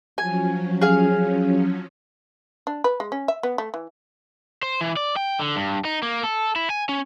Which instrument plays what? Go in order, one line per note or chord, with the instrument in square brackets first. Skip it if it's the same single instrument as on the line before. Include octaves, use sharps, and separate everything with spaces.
[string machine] F3 F#3 C#4 [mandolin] G#5
[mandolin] G#4 F5
[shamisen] D4
B4
G#3
C#4
E5
B3
A3
E3
[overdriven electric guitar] C5
E3
D5
G5
D3
G2
D#4
A#3
A4
E4
G#5
C#4